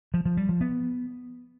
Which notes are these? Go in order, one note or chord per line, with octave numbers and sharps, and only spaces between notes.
F3
F3
G3
F3
B3